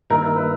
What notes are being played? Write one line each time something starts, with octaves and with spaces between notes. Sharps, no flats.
G2 D#3 A#3 E4 A#4
A#4
B4